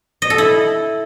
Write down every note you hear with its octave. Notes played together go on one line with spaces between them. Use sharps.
D#5
A4
E4